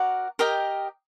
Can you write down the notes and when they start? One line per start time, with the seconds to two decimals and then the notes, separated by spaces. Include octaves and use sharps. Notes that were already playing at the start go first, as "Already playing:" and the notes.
Already playing: F#4 A#4 D5 F#5
0.39 G4 A#4 D#5 G5